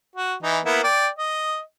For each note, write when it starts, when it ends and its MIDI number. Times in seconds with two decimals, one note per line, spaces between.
0.15 0.34 66
0.43 0.59 52
0.43 0.59 63
0.65 0.83 58
0.65 0.83 59
0.65 0.83 64
0.84 1.09 74
0.84 1.09 79
1.18 1.60 75